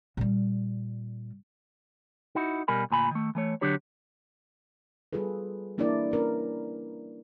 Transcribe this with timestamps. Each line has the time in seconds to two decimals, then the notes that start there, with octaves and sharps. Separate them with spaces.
0.17 A#2 G3
2.35 D#4 E4 F#4
2.68 B2 G3 A#4 G#5 B5
2.90 D2 A#2 G#5 B5
3.11 D#3 A3
3.35 E3 A3 C#5
3.61 D3 F#3 D4 G4 C#5
5.13 G3 F4 G#4 A4 B4
5.78 E3 A#3 D4 E4 A#4 D5
6.11 C#4 A#4 B4